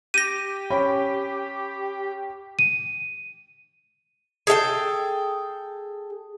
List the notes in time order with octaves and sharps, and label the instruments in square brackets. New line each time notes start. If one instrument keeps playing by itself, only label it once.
[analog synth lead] G4 [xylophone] A#6 D#7
[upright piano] C#4 G5 B5
[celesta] D#7
[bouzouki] G#4 A4 F5 G5